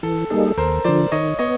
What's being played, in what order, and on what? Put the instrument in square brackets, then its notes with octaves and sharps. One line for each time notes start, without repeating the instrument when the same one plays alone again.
[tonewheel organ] E3 [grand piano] A4
[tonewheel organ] G3 A#3 D#4 G#4 [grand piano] A4
[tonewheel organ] D#2 [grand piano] A#4 C5
[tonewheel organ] D3 F3 [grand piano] C5 D5
[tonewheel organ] D#3 [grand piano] C#5 D#5
[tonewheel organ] B3 [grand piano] C#5 D#5